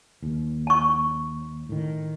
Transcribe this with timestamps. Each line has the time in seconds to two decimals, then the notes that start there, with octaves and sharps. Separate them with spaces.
0.23 D#2
0.67 A5 C#6
1.69 A2 D#3